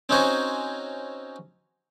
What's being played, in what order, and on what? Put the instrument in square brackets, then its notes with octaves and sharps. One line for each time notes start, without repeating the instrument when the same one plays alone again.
[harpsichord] C4 C#4 D#4 F#4 C5 G#5